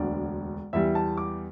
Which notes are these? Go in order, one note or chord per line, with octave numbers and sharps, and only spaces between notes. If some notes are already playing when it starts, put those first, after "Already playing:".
Already playing: E1 D2 D3 D5
E2 E3 G3 E5
A5
D6